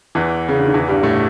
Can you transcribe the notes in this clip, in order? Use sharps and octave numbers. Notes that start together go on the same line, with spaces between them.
E2 E3
C#3
D3
D#3
E2 E3
G2 G3
A2 A3